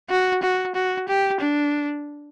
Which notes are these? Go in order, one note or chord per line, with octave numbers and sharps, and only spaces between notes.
F#4
F#4
F#4
G4
D4